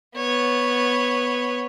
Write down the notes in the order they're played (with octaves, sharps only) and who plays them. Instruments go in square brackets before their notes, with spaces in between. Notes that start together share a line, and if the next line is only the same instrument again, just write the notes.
[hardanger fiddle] B3 C#5